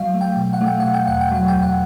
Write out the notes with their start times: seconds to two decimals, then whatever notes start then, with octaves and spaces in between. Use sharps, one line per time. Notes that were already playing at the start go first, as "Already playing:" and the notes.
Already playing: F#3 F5
0.14 A3
0.21 G5
0.36 B2
0.53 F#5
0.61 A3
0.66 G5
0.80 B2 F#5
0.94 G5
1.07 E2 F#5
1.21 G5
1.31 F#3 F#5
1.48 G5
1.55 E2
1.62 F#5